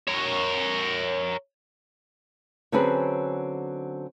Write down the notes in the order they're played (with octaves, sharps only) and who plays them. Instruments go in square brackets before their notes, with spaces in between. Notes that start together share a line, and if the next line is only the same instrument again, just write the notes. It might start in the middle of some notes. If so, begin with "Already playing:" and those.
[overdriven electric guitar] A#4 C#5
[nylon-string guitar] D3 F#3 C4 C#4 G#4 B4